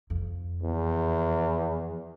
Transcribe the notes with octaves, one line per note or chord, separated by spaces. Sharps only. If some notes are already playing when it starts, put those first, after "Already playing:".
F2
E2